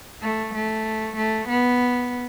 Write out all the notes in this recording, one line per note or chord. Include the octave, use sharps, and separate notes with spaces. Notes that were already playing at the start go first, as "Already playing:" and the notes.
A3
A3
A3
B3